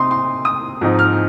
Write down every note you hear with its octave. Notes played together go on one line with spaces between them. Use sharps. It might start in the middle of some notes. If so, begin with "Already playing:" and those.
Already playing: C3 C4 D#4 C6 D#6
C6
D#6
G#2 F3 C4 D#4
F6